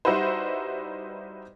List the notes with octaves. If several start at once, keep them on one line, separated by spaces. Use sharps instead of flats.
G3 D#4 E4 F#4 B4 C5